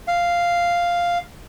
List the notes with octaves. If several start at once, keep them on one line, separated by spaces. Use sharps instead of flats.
F5